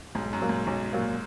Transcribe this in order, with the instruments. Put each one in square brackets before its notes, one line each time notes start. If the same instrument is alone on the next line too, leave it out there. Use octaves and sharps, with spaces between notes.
[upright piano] B1 [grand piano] G#2
[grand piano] F#2
[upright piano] A#2 F#3 A#3
[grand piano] G#2
[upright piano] B1
A#2 F#3 A#3